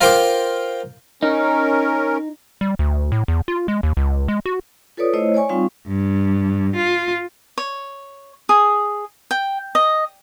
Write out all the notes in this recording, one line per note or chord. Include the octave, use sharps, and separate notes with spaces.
F4 A#4 C5 F5 G5 D6
C#4 D#4 A#4
G3
D2
A2
E2
F4
G#3
D#2
C#2
G#3
F#4
F4 A4 B4 C#5 D5 D#6
A3 E4 C5 C#5 D#5
C#5 D5 G#5 C#6
G3 C4 D#4 F4 F5 C#6
G2
F4
C#5
G#4
G5
D#5